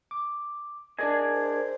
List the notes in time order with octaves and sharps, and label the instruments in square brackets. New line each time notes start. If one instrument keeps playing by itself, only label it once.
[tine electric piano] D6
[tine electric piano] D4 D5 D#5 [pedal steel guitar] G#4 A#4 G#5
[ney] C5